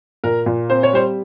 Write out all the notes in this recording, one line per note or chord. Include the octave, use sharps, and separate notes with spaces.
A#2 A#4
A#2
C4 C5
C#5
G3 C5